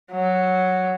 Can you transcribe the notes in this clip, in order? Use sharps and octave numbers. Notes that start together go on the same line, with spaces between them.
F#3